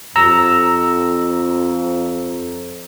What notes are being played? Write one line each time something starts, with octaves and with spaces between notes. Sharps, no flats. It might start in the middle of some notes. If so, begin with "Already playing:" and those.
F2 A#5 E6